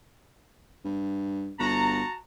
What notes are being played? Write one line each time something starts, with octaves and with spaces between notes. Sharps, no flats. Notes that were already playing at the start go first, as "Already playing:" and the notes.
G2
G1 F#4 A5 A#5